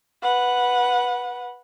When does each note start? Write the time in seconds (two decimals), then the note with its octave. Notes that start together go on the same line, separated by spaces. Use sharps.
0.22 B4 F#5